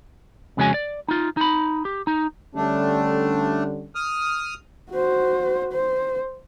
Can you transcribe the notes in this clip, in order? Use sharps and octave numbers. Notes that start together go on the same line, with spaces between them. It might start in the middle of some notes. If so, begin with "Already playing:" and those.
F2 C#3 G#3 C#4 F#4 G#5
D5
D#4 F4
D#4 B5
G4
D#4
D3 G3 A3 C#4 D4
D#6 F6
F#4 C5
C5